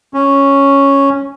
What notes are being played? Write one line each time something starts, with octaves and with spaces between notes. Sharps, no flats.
C#4